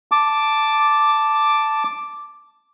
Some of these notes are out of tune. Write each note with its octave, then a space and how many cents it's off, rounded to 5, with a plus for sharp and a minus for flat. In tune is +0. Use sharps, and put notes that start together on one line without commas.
A5 +0 D6 +0